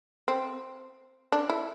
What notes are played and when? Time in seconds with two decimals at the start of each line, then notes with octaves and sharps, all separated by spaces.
0.28 C4
1.32 D4
1.49 E4